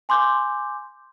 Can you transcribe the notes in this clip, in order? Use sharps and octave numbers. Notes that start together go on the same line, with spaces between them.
G#5 C6 D6 G6